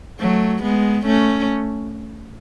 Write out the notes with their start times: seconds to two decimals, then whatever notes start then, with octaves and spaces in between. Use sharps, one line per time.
0.20 F#3 A3
0.63 G#3 B3
1.07 A3 C#4